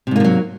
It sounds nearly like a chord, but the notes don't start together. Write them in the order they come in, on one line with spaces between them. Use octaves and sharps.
C3 G#2 A#3 F3 F#3